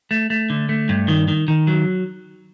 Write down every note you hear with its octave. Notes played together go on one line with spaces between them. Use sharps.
A3
A3
D3
A3
G2
D#3
D#3
D#3
F#3